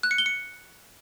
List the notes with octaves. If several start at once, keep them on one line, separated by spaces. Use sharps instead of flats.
F#6
C#7
G7
C#7